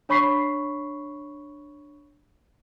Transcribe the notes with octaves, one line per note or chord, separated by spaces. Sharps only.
D4 C#5 B5 C#6 B6 C7